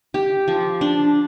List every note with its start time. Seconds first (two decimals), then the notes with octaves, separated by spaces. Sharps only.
0.14 G4
0.48 F3
0.81 D4